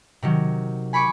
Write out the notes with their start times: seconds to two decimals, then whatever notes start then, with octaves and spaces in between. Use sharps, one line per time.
0.23 C3 D#3 F#3
0.93 G#5 B5 C#6 D6 C#7